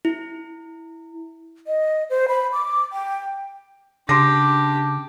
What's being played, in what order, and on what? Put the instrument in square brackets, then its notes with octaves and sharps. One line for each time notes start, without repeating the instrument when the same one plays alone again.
[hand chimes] E4
[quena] D#5
C5
B5
D6
G5
[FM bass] C#3 [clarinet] D4 [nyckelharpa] G4 [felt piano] C6 D6 A#6